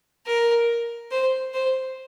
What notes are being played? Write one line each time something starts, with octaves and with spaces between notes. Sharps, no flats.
A#4
C5
C5